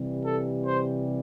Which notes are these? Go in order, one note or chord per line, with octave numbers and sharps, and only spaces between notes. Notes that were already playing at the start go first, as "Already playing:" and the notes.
Already playing: C3 E3 G3
A4
C5